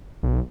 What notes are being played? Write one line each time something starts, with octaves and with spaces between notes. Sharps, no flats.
B1